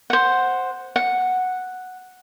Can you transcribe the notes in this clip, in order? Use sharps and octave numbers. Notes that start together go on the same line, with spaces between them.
C5 F#5
F#5